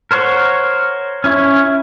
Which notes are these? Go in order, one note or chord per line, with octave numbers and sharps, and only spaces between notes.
A#4 C5 C#5 F#5
C#4 E4 C#5